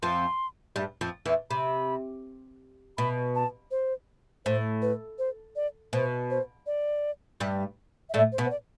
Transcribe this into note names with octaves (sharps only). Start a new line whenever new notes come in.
F2 F3 C6
G2 G3
F2 F3
E2 E3
C3 B5
B2 B5
A5
C5
A2 C5
B4
C5
D5
B2 C5
C5
D5
G2 G3
E5
A2 A3 D5
C5
B2 B3
C5
D5